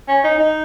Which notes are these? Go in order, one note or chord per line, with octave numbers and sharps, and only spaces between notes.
C#4
D#4
D#4